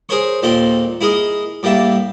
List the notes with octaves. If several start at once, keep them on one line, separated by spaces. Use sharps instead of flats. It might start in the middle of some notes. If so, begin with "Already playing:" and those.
G#4 A#4 C5 C#5 C#6
D#2 A#2 C4 A4 A#4 C6
E4 G#4 A#4 D#5
A2 G3 A#3 E5 A5